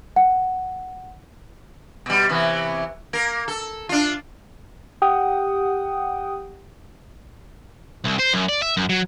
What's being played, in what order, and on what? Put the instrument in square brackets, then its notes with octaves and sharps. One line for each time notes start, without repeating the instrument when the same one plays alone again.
[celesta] F#5
[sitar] B2 G3
C3 E3 B3
A#3 A#4
A4
D4 F4
[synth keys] G4 F#5 G5 D#6
[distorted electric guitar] C2
C5
F#2
D5
E5
F#2
F#3